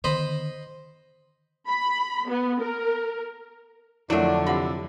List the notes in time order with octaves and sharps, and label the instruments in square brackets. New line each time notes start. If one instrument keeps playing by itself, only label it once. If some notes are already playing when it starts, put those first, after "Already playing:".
[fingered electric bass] D3 D#3 B3 [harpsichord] C5 D#5 B5
[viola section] B5
B3
A#4
[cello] F2 D3 [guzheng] F#3 A3 [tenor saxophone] D4 [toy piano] E4
[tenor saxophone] C3 [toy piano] F4 F#5 [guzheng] B5